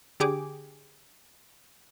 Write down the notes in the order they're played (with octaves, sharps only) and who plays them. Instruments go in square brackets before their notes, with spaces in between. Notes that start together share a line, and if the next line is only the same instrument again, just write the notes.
[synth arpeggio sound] D3 G4 G#4 D6